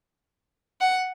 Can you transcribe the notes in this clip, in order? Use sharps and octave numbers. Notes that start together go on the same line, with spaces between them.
F#5